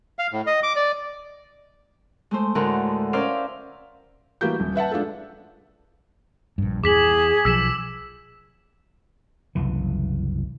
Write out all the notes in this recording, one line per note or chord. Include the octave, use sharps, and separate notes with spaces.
F5
A2
D#5
D6
D5
G#3 A3 C5
D2 A2 D3 G#3 A#4 F#5
C#4 A#4 C5 D5 E5 F5
E3 G3 A#3 F#4 G4 G6
D#1
B4 E5 F#5 A5
G#3 D4 F4 G#4 A4
A#1 G2
E2 G#4 D6 B6 F#7
B1 F3 E6 B6 E7
F#1 C2 E3